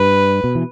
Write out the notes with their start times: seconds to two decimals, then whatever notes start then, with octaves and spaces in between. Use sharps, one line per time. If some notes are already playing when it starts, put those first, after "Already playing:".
Already playing: G2 B4
0.44 B2
0.55 E3